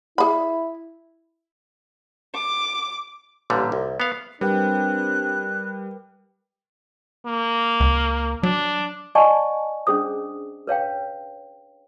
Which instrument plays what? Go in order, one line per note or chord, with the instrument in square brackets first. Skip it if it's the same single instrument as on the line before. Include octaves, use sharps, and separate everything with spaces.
[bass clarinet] E4 [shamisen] G#4 B5
[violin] D6
[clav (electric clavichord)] A1 A#2 D3 G3
C2
B3 F5
[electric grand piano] G3 [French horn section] C4 D4 [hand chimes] A#4 B4 G5 [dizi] F#6
[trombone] A#3
[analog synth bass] C#2
[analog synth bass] F#3 [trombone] D4
[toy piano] D5 D#5 F#5 G#5 A5 C#6
C#4 D4 G#4 C5 D#6
B4 C#5 F5 G5